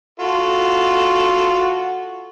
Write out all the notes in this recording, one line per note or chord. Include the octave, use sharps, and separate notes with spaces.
F4 F#4 A4